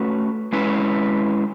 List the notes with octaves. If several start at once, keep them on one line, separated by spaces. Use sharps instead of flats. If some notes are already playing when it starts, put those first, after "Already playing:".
Already playing: A3 C#4 F#4 B4
G#3 C#4 E4 B4